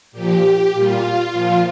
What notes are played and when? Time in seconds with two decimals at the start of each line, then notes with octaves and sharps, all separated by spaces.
0.12 A#2 F3 G4
0.42 G4
0.72 A#2 G3 F4
1.32 A#2 F3